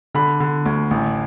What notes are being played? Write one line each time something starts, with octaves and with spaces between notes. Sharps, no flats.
D3 B5
D3
D2
A1